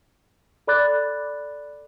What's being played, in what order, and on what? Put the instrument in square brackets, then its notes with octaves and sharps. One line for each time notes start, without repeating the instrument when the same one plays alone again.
[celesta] A4 D5 B5 D6 F#6 A6